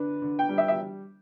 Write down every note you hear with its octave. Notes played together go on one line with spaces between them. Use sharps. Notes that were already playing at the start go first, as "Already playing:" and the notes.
Already playing: D3 D4 B4
D3
G5
G3
E5
E5